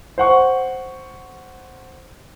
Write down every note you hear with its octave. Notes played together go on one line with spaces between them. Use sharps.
C5 F#5 C#6